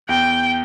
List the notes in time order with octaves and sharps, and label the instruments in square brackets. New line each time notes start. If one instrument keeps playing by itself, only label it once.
[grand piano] E2 [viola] G5